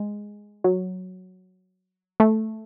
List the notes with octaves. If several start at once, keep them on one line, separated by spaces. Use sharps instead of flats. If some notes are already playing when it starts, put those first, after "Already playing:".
Already playing: G#3
F#3
A3